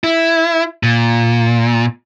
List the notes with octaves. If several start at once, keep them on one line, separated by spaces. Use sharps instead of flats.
E4
A#2